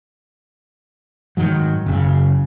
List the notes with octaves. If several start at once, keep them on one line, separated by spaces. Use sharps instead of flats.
G#2 D#3 F#3
F#1 C#3